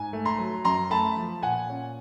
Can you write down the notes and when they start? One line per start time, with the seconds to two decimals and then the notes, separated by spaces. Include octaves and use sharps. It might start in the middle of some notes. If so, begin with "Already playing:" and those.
Already playing: G#2 G#5
0.13 A3
0.25 A#5 C6
0.39 F#3
0.65 F#2 A#5 C6
0.90 A3 A5 B5
1.17 F3
1.43 A#2 F#5 G#5
1.69 C#4